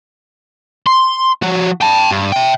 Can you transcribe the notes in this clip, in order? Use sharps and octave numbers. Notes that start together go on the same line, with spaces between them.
C6
F3 F#4
G5 A5
G2
E5 G5